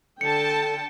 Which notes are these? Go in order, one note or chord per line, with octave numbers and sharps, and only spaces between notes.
D3 A4 G5 A5 C#7